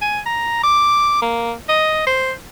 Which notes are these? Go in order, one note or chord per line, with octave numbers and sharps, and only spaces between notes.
G#5
A#5
D6
A#3
D#5
C5